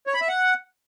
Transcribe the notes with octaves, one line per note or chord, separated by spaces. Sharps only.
C#5
B5
E5
F#5